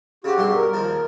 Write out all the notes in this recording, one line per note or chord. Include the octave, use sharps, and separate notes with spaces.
C#3 C4 F#4 G4
B1 G2 C6
A#4
D#2 F3